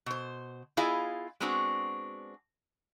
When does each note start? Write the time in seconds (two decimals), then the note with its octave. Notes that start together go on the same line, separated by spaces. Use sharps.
0.06 B2 C5
0.77 B3 E4 F4 G#4 D#5 F5
1.40 G#3 B3 C4 D4 F#4